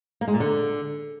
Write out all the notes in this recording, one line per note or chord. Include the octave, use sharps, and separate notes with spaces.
A#3
G#3
A#2
D3